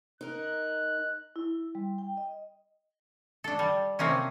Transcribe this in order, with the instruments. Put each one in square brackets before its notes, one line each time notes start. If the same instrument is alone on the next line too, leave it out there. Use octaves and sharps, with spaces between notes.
[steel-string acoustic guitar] D#4 A#4 [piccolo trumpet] F#6
[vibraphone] E4
G3
G5
D#5
[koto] D4 A4
G3
C3 F3 A#3 C4 C#4